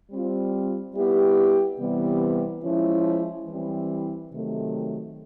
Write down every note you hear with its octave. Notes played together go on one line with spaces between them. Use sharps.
G3 C4 F4
G3 B3 E4 G4
C3 E3 G3 B3
F3 G#3 C#4 E4
E3 G3 C4 E4
C3 D#3 F#3 A3 C4